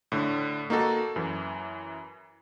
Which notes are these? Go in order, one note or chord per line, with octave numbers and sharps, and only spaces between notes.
A2 D3
A#3 D#4 F#4 A4
F#2 E3